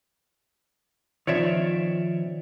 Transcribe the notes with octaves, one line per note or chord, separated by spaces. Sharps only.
D#3 F3 C4 C#5 D5 E5